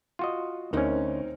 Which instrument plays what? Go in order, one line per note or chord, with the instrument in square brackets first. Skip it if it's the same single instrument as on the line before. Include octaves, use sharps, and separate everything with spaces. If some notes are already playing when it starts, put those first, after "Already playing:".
[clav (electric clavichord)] F4 F#4 D#5
[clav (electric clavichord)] D2 C#4 [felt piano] C4 D#4 A#4